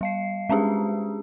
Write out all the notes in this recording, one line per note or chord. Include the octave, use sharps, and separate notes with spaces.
G3 F5 C7
G#3 C#4 D4 G4 G#4